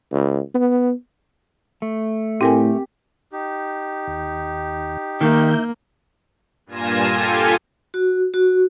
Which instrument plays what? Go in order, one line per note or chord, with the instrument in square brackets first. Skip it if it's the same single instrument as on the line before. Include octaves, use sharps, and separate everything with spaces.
[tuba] C#2
B3
[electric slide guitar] A3
[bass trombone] A2 [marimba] C4 A#4 G#5 [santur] G4
[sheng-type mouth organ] D#4 G4
[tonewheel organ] D#2
[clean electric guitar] D#3 [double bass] A#3 [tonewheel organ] E5 G6
[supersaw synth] G2 A#2 F4 G#5 A#6 E7
F4 G4 A4 G#5
[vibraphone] F#4
F#4